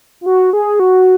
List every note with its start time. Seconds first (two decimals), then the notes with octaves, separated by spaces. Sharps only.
0.21 F4
0.26 F#4
0.53 G#4
0.80 F#4